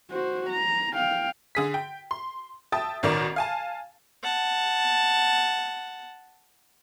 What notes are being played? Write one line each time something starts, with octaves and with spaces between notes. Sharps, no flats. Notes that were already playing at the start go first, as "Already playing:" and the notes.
F#4 C5
A#5
F5 G5
D3 G#4 B6
G5
C6
E5 G5 A5 D#6 A6
A1 B2 D#3 A#4 D5
F5 G#5 A5
F#5 A5